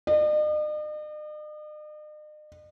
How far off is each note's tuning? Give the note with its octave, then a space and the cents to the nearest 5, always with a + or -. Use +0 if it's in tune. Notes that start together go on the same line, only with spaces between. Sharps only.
D#5 -45